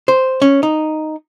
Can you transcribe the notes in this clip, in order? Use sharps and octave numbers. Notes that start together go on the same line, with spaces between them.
C5
C#4
D#4